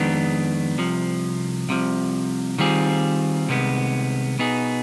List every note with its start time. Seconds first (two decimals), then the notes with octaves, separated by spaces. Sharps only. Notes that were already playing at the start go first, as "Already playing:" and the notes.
Already playing: F2 D#3 G#3 B3 D4
0.78 C2 C3 F3
1.69 C2 C3 F3
2.59 D#3 G3 C4 F4 G#4
3.48 C2 C3 D#3 G#3 B3
4.39 B2 B3 D#4 G#4